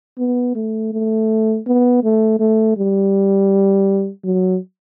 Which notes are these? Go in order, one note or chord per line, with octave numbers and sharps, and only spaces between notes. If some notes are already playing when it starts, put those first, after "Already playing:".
B3
A3
A3
B3
A3
A3
G3
F#3